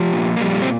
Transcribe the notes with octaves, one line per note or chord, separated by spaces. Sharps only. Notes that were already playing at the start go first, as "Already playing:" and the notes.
Already playing: F3 G4
A#2
A#3
F2 G3
C4